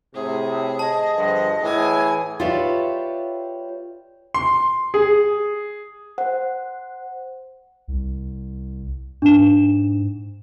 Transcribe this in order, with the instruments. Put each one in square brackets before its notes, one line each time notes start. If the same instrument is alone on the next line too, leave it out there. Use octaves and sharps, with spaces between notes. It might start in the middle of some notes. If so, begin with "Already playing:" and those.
[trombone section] A2 C3 [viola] G#4
[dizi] D#5 [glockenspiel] A5
[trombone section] G2 D3 F3
[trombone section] A2 E3 [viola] G#4 G#5
[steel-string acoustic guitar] F4 G4 B4 C#5 D5 E5
[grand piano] C6
G#4
[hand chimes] C5 F#5
[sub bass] C2
[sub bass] G#2 [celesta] D4 E7